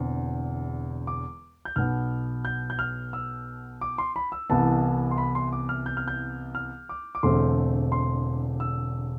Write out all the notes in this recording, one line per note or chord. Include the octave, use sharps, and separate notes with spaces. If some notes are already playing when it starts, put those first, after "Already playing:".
Already playing: E1 E2 D3 C4
D6
G6
B1 B2 B3 F6
G6
G6
F6
E6
D6
C6
B5
E6
C2 C3 E3 B3 A5
C6
B5
C6
D6
F6
G6
F6
G6
F6
D6
D6
E1 E2 D3 A3 C4 C6
C6
E6